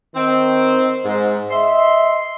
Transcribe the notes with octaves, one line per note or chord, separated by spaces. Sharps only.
D#3 C4
G#2
D#5 E5 C6